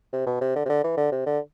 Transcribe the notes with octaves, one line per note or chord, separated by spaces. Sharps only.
C3
B2
C3
D3
C3
D3
E3
D3
C3
D3